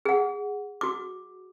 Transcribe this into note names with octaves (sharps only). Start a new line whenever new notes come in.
G#4 F#5
F#4 D6